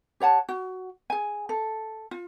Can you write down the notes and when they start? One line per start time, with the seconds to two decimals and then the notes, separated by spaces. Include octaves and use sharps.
0.20 G4 C#5 F#5 A5
0.49 F#4
1.10 G#4 G#5
1.49 A4
2.11 F4